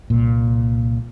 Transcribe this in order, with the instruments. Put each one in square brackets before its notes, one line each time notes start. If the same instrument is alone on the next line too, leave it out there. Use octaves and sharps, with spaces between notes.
[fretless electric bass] C2 A#2